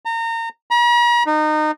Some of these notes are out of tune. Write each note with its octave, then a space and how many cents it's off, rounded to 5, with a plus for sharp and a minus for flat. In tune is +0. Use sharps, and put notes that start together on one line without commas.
A#5 -30
A#5 +45
D#4 -25